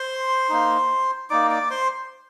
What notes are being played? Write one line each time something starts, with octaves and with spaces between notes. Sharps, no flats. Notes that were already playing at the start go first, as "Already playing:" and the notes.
Already playing: C5 C6
A#3 D#4
A#3 D#4 D5 D6
D5 D6
C5 C6